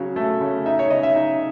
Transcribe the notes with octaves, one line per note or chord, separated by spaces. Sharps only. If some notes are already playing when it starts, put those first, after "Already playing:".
Already playing: C#3 F#3
A3
C#3
D#4 E5
C#5
C#3 D#5
E5
D#4